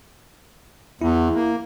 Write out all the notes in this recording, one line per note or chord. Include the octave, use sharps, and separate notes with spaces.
E2 E4
A#3